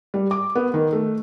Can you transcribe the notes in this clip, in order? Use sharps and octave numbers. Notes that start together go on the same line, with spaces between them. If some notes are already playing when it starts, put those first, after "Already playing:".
G3
D6
B3
D#3
A3